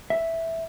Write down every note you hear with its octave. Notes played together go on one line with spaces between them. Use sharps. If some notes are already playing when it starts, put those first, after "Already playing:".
E5